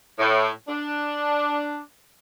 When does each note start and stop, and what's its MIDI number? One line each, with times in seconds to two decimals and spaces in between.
0.19 0.49 45
0.68 1.77 62